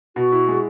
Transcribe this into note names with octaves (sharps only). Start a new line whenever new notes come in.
B2 F#4
E4
G#3